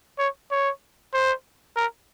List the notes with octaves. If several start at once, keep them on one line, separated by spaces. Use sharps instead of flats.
C#5
C#5
C5
A#4